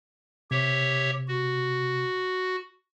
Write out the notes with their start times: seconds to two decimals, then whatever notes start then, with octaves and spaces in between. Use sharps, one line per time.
0.51 C3 G4 C#5 E5
1.28 F#4